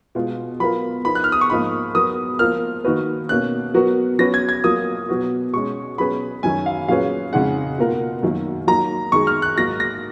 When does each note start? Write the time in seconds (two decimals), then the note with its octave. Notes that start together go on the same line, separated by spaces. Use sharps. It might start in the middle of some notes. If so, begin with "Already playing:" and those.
0.15 B2 G#3 B3 F4
0.60 F#3 B3 F4 A#4 B5
1.05 F3 B3 D#4 A#4 B5
1.15 F#6
1.24 F6
1.32 D#6
1.41 C#6
1.50 G#2 F3 A#3 B5
1.94 F#3 B3 F#4 A#4 D#6
2.39 F3 A#3 F4 A#4 F6
2.84 D#3 A#3 D#4 F#4 B4
3.29 B2 A#3 C#4 F#6
3.74 F#3 B3 F#4 A#4
4.19 F#3 C#4 F#4 B4 A#6
4.34 G#6
4.49 G#6
4.64 F#3 A#3 F4 A#4 D#6
5.09 B2 F#3 B3 F#4
5.53 B2 G#3 C#4 C#6
5.98 B2 F#3 C#4 G#4 B4 B5
6.43 F#2 D#3 F#3 C#4 G#5
6.66 F5
6.88 A#2 F#3 C#4 G#4 B4 F5
7.33 F2 C#3 G#3 D#4 G#4 F#5
7.78 B2 A#3 F4 A#4
8.23 F#2 D#3 F#3 A#3
8.67 F#3 A#3 D#4 A#5
9.12 F#2 D#3 G#3 D#4 G#4 C#6
9.27 F6
9.42 F#6
9.57 G#2 F#3 A#3 A#6
9.80 A#6